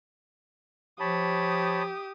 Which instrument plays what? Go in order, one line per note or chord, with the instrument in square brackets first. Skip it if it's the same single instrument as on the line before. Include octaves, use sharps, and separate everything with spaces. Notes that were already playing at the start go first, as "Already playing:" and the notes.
[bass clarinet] F3 [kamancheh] G4 D#6 [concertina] C#5 A5 B5